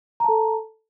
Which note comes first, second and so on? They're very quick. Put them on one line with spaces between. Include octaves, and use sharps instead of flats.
A#5 A5 A4